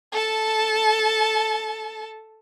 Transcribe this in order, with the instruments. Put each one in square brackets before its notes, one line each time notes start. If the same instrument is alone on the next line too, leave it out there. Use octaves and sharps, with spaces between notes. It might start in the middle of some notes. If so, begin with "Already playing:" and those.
[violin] A4 A5